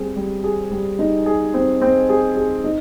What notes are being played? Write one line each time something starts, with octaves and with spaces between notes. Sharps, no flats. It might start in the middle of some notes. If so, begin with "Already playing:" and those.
Already playing: G3 C4 G#4
G3
G#4
G3
D#4
G#4
C4
C4
G#4
G#4
D#4